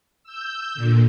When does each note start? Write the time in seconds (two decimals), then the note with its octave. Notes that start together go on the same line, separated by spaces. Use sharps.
0.23 E6 G6
0.75 A#2 D3